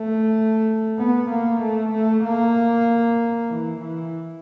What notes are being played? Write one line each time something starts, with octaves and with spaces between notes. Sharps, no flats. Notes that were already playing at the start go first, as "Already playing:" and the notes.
Already playing: A3
B3
A#3
A3
A3
A#3
E3
E3